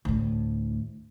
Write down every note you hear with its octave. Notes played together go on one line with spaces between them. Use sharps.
D2 A2